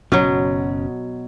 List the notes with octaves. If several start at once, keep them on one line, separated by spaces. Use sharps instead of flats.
F#1 B2 F#3 C#4